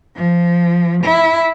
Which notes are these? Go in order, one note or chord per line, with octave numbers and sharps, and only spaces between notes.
F3
E4